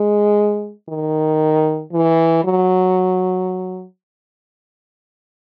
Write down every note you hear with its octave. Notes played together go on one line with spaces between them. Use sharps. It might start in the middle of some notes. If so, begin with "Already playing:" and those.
Already playing: G#3
D#3
E3
F#3